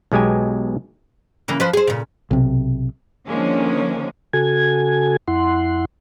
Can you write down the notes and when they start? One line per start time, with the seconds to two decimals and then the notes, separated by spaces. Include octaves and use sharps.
0.12 B1 B2 G#3 G4 G#5
1.48 C#3 E3 A#3
1.60 F3 B4 C5
1.73 G#4 C5
1.87 A#2 C#3
2.31 B1 C3
3.28 D3 D#3 F3 G#3 A#3 C#4
4.33 C#3 F#4 A4 G#5 G#6
5.28 F2 E4 F#5 C6